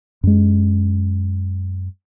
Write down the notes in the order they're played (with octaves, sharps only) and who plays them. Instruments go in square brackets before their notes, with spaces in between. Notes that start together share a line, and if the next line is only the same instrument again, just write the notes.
[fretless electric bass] F#2 G#3